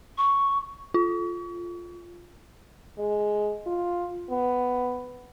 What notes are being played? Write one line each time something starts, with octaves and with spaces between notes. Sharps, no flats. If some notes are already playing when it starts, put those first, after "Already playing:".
C#6
F4
G#3
F4
B3